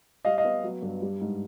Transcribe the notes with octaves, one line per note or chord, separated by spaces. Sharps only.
G3 D#5 F5
D#5 F5
B3
F#3
G2
G3
G#2